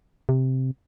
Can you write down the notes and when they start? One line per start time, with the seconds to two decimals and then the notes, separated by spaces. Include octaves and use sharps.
0.29 C3